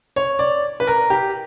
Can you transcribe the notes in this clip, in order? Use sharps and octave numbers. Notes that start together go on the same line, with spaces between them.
C#5
D5
B4
A#4
G4